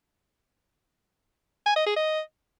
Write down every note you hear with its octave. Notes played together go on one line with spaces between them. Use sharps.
G#5
D#5
G#4
D#5